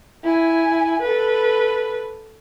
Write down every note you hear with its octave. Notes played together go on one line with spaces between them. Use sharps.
E4 G#5
A4 B4